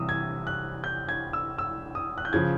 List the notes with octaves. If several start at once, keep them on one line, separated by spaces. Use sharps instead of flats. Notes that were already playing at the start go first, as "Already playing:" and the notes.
Already playing: C3 E3 G3 D#6 E6
G#6
F#6
G6
G#6
E6
E6
D#6
F#6
G6
C#3 F3 G#6